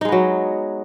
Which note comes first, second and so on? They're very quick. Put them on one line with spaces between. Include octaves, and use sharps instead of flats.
D#4 G#3 B3 F#3